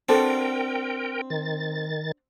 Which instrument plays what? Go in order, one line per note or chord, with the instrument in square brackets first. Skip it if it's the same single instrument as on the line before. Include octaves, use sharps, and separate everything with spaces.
[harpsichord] C4 [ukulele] D4 F#4 A4 [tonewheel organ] A#4 G5
[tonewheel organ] D#3 A6